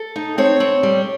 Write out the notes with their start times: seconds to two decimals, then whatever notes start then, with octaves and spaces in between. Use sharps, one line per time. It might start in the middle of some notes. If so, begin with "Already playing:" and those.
Already playing: A4
0.16 D#4
0.38 C4 C#5
0.60 C4
0.83 G3